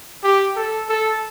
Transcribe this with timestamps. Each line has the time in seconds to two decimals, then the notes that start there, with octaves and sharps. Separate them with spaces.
0.23 G4
0.56 A4
0.89 A4